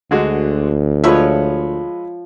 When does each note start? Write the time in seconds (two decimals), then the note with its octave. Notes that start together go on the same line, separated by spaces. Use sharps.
0.11 D2 D3 G#3 F#4
1.04 F3 G#3 B4 C#5 E5